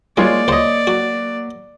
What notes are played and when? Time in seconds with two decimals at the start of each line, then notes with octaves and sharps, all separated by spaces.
0.17 G3 G#3 A#3 F4 C#5 D5
0.48 C#2 C5 C#5 D#5
0.87 F#3 F#4